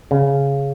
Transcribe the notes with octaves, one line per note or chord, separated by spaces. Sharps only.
C#3